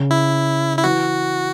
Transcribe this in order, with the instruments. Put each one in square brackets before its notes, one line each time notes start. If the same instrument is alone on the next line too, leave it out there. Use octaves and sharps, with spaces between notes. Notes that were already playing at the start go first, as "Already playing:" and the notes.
Already playing: [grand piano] C#3
[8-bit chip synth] E4
E4
[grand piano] E3 [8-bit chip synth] F#4